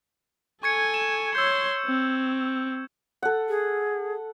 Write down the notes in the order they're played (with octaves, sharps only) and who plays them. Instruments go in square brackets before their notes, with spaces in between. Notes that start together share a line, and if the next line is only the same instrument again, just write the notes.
[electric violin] A4 G#5 [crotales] C#6 G#6 C#7
[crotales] E7
[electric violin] C#5 C6 [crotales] E6 G6
[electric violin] C4
[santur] A4 F#5
[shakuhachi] G#4